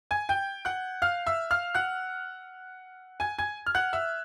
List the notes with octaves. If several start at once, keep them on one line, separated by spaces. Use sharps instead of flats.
G#5 G#6
G5 G6
F#5 F#6
F5 F6
E5 E6
F5 F6
F#5 F#6
G#5 G#6
G#5 G#6
F6
F#5 F#6
E5 E6